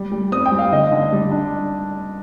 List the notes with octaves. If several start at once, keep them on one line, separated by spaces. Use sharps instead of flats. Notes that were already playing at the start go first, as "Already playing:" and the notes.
Already playing: G3
G3
C4 D#6
G5
G3
F5
D3 D#5
D3
G3
D4